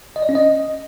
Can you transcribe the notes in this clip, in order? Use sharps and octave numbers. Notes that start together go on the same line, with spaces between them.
D#5
D5
C#4
D#5